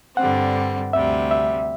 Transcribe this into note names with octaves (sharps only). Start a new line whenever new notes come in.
G2 D3 G3 C4 F#5
D2 C3 G3 E5
E5